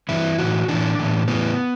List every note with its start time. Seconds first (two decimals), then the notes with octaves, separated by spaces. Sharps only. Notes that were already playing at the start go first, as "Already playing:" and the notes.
0.09 G2 E3 E4
0.38 A2 E3 F#4
0.68 A2 E3 D4
0.99 A2 E3
1.28 A2 E3 B3